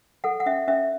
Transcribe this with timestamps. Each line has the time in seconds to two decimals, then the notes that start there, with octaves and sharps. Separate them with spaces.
0.24 A4 F#5
0.40 F#5
0.46 C#4 E5
0.68 C#4 E5